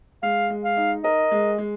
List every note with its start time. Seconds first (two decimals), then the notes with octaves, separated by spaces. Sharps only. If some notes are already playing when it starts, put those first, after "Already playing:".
0.23 G#3 F5
0.50 G#3
0.64 F5
0.77 D#4
1.04 A#4 D#5
1.31 G#3
1.58 G#3